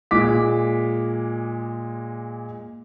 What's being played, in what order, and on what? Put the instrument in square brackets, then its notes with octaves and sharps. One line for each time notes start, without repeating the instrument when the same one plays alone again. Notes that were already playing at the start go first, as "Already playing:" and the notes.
[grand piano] A#2 G#3 D6 B6